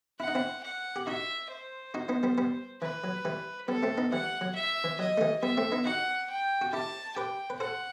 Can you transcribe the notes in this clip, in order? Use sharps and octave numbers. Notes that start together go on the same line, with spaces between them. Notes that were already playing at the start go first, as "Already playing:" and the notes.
E4 F#5
D#4
C4 E4
F#5
G4
D#4 F#4 E5
C5
D#4 F#4
B3 D#4
G3 B3
G3 B3
E3 B4
F#3
E3 G3
G3 B3 A4
A3 C4
B3 D#4
E3 G3 F#5
F#3
E5
E3
F#3 D#5
A3
E3 G3
G3 B3 E5
A3 C4
B3 D#4
D#4 F#4 F#5
G5
F#4
E4 G4 A5
G4 B4 G5
B4
A4 C5 F#5